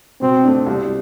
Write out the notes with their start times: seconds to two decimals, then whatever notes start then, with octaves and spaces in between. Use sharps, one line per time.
0.21 B2 C4
0.44 A3 D4
0.66 C2